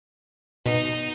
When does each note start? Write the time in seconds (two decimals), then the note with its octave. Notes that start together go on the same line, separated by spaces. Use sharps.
0.66 B2 D#4